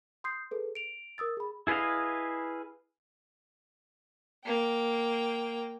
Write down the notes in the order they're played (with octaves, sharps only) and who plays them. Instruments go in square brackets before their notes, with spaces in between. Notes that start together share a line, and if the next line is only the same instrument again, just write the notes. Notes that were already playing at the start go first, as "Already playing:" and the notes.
[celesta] C6 D#6 G6 C7
G#4 A4 B4
D7 F7
A#4 D#6 E6 A6
G#4 B5
[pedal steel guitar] E4 G#4 B4 D#5 F5
[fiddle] A#3 G5